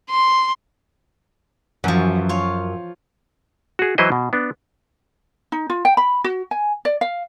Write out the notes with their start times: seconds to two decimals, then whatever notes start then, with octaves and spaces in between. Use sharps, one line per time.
0.10 C6
1.84 F#2 E3 F3
2.29 F4 C#5
3.79 F#4 G#4
3.98 E3 F#3 E4 B4 C5 D#5
4.12 B2
4.33 B3 D4
5.52 D#4
5.70 F4
5.85 G5
5.97 B5
6.24 F#4
6.51 G#5
6.85 D5
7.01 F5